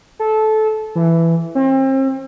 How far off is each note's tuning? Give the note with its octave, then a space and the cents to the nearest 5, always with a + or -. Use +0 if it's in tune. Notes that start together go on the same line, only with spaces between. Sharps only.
A4 -20
E3 +10
C4 +35